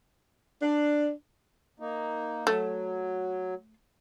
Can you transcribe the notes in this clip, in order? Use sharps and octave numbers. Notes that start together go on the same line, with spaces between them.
D4
A#3 D#4
F#3 A3